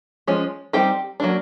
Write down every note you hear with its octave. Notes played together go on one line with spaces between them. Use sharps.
F3 G#3 C#4
G3 C4 D#4 G4 G5
F#3 A#3 D4